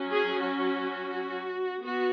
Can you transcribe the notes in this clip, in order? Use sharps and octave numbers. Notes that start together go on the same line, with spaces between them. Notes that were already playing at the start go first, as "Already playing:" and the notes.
Already playing: F#3 C#4
G#4
F#4
B3 F#4